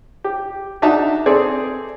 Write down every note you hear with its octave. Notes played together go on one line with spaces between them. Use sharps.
G4
D4 D#4 F#4 E5 A5 A#5
C4 G#4 A4 D5 A5